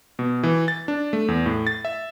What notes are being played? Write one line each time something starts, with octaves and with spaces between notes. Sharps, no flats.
B2
E3
A6
D4
A3
E2
A2
A6
E5